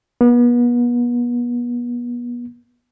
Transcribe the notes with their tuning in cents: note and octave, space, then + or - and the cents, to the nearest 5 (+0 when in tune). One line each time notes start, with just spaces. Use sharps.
B3 -35